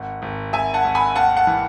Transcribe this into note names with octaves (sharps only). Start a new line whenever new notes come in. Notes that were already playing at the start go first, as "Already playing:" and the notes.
Already playing: G#1 F#5
G#1
G#1 E5 G#5
F#5 A5
G#1
G#5 B5
D#2 F#5 A5
F#5 A5
E3